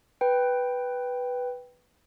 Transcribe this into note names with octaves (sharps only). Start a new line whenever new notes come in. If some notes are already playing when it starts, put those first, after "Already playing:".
B4 G5